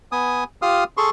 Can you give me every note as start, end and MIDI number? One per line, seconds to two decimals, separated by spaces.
0.12 0.44 59
0.12 0.44 80
0.12 0.44 87
0.62 0.84 65
0.62 0.84 67
0.62 0.84 77
0.62 0.84 87
0.62 0.84 89
0.97 1.10 68
0.97 1.10 69
0.97 1.10 84
0.97 1.10 85